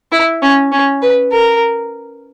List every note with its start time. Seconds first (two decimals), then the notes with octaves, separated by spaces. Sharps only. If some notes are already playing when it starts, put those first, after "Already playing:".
0.12 E4
0.42 C#4
0.72 C#4
1.02 B4
1.32 A#4